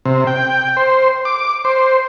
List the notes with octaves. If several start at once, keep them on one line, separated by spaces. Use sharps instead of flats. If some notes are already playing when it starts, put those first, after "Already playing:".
C3
G5
C5
D6
C5